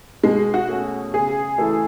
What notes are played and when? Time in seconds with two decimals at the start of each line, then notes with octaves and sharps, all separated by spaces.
0.24 B2 G#3
0.54 F#4
0.69 A3 C#4 G#4
1.14 C#3 G#4
1.58 E3 A3 E4 A4